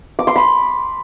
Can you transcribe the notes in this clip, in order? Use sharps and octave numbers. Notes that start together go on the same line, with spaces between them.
D6
C6
B5